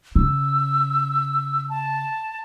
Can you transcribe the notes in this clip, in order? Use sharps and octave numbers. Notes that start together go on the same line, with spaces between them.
C#3 E6
A5